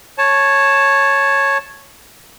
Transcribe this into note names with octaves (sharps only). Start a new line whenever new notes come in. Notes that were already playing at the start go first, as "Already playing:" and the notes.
C#5 A5